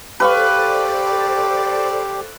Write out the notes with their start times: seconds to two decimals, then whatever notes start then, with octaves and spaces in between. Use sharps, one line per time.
0.20 G4 A4 B4 C5 D5 F5 C#6